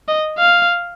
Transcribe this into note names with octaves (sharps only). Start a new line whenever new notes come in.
D#5
F5